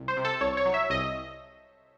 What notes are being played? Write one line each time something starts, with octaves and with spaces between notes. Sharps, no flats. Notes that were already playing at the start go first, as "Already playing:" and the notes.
Already playing: C2
C5
C3
A4
C2 C#5
C#5
F#3
E5
C2 D#5